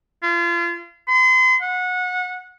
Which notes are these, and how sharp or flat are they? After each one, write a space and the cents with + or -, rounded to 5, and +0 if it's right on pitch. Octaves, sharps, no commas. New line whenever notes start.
F4 -35
C6 -40
F#5 -25